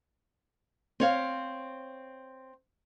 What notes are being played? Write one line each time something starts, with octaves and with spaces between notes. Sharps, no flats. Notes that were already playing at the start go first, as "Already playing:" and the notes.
C4 C#5 F5